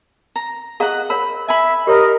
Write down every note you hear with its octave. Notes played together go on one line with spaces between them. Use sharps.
A#5
G#4 D#5 F5 F#5 A#5
A#4 C#5 B5
E5 G#5 B5
G4 A#4 C#5 D#5